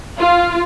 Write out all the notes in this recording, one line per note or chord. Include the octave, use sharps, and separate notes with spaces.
F4